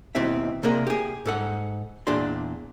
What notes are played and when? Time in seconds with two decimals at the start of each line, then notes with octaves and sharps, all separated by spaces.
0.15 D#2 B2 C4 E4 G4 E5
0.63 C3 A#3 C4 G#4 A#4 D5
0.87 G4 G#4
1.26 G#2 A4 F#5
2.07 E2 A#2 D4 G#4 D5 C6